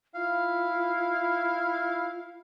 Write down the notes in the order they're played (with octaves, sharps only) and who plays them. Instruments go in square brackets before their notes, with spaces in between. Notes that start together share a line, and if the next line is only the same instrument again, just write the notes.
[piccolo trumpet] E4 [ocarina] F4 [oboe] F5